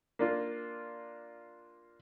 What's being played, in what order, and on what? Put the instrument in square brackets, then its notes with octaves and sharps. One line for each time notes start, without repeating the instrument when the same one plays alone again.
[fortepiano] A#3 D4 F4